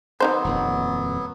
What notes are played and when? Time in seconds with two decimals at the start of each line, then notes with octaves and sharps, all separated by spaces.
0.20 D#3 F#3 B3 D#4 C5
0.44 D#1 F2 A#3